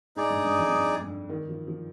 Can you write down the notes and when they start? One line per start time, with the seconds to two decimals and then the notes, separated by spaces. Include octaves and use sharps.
0.16 G#2 D#4 G#4 D5
0.30 G2
0.44 G2
0.59 F2
0.72 G2
1.01 G2
1.29 D#3
1.48 F3
1.67 F3